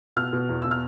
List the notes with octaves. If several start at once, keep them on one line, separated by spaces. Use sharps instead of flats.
B2 F6
B2
E2
B2 E6
F6